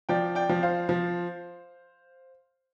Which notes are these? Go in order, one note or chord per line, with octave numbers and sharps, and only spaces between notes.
F3 D5 G5
D5 G5
F3
C5 F5
F3